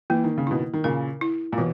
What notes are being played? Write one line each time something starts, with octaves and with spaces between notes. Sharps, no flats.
E3 A#3
D#3
C#3
B2 D#3 E4
D#3
A#2 C#3 A#4
E4
A#2
B2 E3